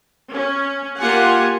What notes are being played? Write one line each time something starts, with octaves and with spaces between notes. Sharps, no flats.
C#4
A#3 F4 G4 F#5 G#5